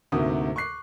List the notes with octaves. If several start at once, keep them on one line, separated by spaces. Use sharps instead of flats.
D2 G#2 C3 A#3 F#4 D#6
C#6 D6 F#6 C7